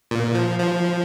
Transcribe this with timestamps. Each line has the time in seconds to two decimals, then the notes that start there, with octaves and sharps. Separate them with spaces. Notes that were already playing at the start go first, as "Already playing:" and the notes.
0.11 A#2
0.35 F3
0.59 F3